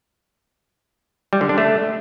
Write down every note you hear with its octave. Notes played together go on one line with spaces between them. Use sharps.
G3
D3
D4
A3